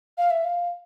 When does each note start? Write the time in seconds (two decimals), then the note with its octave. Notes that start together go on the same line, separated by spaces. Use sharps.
0.18 F5
0.31 E5
0.45 F5